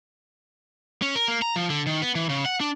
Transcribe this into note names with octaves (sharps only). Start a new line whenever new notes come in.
C#4
A#4
A#3
A#5
F3
D3
D#3
B3
E3
C#3
F#5
D4